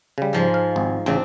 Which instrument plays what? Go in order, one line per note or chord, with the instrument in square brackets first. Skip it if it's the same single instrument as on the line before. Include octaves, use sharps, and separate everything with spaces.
[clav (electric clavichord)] C#3 G3
[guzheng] G#2 F3 G#3
[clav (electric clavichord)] F5
G#1
[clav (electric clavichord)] A1 C#3 [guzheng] C4 D4